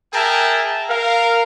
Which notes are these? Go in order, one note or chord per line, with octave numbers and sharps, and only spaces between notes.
G#4 A#4 E5 G5 A5 A#5
A#4 F5